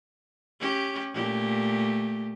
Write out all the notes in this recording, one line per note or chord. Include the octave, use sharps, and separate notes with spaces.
C#4 G4
A#2 A3 G4